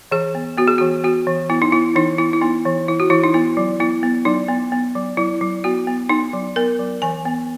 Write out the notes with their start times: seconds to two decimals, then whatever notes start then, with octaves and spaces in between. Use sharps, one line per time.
0.11 E3 G#4
0.35 B3
0.57 B3 F#4
0.68 G#4
0.78 E3 F#4
1.04 B3 F#4
1.27 E3
1.50 B3 E4
1.62 D#4
1.72 B3 E4
1.96 E3 D#4
2.18 B3 E4
2.33 E4
2.42 B3 D#4
2.65 E3
2.88 E3 E4
3.00 F#4
3.10 E3 E4
3.24 D#4
3.34 B3 E4
3.57 F#3
3.80 B3 E4
4.03 B3
4.25 F#3 D#4
4.49 B3
4.72 B3
4.96 F#3
5.17 F#3 E4
5.41 F#3
5.64 B3 F#4
5.87 B3
6.09 B3 D#4
6.33 F#3
6.56 B3 A#4
6.79 F#3
7.02 E3 G#5
7.25 B3